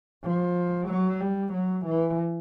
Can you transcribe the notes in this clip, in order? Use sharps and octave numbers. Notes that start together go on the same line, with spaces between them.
F3
F#3
G3
F#3
E3